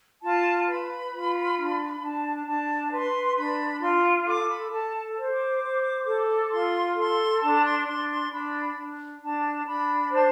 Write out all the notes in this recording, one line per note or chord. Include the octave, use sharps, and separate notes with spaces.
F4 A5
B4 B5
F4
D4
D4 A5
D4 A5
B4 C6
D4 B5
F4 C6
A4 D6
B5
A4 A5
C5
D6
C5
A4
F4 C6
A4 C6
D4 A5
C6
D4 C6
C6
D4 B5
D4
D4 A5
D4 B5
C5 A5